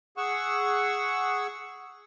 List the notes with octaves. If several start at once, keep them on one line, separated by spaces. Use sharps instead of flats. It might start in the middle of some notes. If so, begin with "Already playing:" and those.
G#4 F#5 C#6 E6